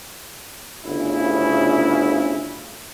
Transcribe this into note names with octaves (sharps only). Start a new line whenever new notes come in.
G1 D2 C#3 E4